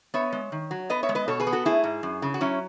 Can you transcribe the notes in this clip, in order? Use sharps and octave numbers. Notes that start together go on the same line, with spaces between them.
B3 C#5 E5
G#3
D#3
F#3
B3 B4 D#5
C#5 E5
G#3
B4 D#5
B2 A4 C#5
G#4 B4
B3
F#4 A4
A3 E4 G#4
G#2
F#2
C#3
F#4
F#3 C#4 E4